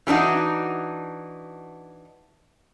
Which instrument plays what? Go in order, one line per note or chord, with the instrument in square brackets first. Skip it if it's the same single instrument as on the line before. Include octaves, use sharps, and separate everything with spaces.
[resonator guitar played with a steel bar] E3 G3 D4 D#4 F#4